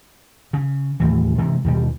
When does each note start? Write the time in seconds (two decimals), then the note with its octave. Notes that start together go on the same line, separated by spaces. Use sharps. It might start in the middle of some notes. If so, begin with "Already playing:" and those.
0.53 C#3
1.00 D#2 A2 E3
1.38 C3 E3 G#3
1.64 D#2 B2 G3